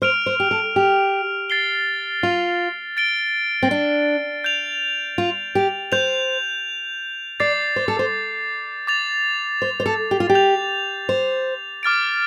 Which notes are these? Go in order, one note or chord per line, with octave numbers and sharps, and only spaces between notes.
C5 F6 D7 F7
C5
G4
A4
G4
A6 C7 G7
F4
A6 D7 G7
C4
D4
G6 F7
F4
G4
C5 G6 F7
D5 D6 A6 C7
C5
A4
C5
D6 A6 F7
C5
C5
A4
G4
F4
G4
G6 F7
C5
D6 F6 A6 D7